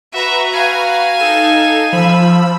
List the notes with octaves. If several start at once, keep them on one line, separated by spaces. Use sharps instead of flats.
F#4 B4 E5 A#5
F5 G#5
D#4 A4 E7
F3 B5 E6